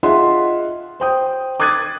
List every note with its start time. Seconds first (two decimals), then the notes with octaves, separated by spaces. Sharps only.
0.03 F4 G#4 D#5 E5 F#5 C6
1.00 C5 G5 D#6
1.60 D6 D#6 F#6 G#6 A6 D#7